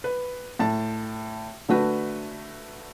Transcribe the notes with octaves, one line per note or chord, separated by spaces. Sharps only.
B4
A2 A5
D3 A3 F#4 B4